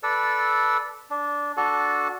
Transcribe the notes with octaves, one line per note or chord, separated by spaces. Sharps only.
A4 B4 D5 E6
D4
D4 F#4 A4 A5